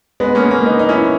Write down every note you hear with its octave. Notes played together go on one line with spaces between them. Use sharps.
G#3 B3
A#3 C#4
A#3 C#4
B3 D#4
D#4
C#4 E4